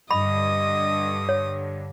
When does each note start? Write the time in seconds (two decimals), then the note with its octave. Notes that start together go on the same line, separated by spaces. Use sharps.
0.11 G2 D3 D#5 B5 D#6
1.29 C#5